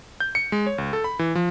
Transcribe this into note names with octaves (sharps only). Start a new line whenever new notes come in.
G6
C#7
G#3
C#5
C#2
A4
B5
E3
F3